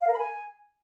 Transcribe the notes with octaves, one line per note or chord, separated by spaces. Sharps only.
F5
A#4
B5
G#5